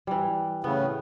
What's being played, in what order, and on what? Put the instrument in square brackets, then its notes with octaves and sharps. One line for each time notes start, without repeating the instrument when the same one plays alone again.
[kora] E3 G3
[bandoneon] A2 C#3 [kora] B3